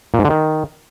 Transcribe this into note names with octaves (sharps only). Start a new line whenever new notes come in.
A#2
G#2
D3
D#3